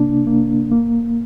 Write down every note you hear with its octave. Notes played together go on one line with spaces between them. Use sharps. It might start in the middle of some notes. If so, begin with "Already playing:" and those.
Already playing: C3 A#3 D4
A#3
A#3